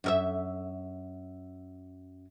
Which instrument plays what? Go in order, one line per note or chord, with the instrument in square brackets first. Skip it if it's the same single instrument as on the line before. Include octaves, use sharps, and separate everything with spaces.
[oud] F#2 A#4 E5